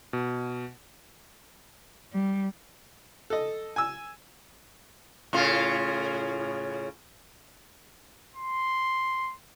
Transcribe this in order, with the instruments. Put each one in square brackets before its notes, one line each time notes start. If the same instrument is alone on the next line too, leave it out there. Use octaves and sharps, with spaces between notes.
[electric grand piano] B2
[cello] G3
[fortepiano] A4 D#5
G#5 E6
[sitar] A2 C#3 F4
[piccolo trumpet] C6